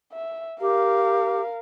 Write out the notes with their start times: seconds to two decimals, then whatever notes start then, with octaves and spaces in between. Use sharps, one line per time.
0.14 E5
0.61 G4 A#4 F5